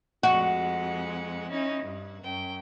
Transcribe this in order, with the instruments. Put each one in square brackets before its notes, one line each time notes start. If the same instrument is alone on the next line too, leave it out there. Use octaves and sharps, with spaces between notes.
[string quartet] F2 G#3 F#5 [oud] F#4
[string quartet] C#4 D#4 E4
G2
F#2 G5